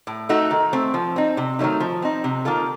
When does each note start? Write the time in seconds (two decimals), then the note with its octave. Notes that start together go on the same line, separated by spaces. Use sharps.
0.07 A2
0.29 A3 D#4 F#4 A4
0.51 D#3
0.73 A3 C4
0.94 F3
1.16 C4 D#4
1.37 C3
1.59 D#3 F#3 A3 D#4
1.80 F3
2.02 C4 D#4
2.24 C3
2.45 D#3 A#3 F4 A4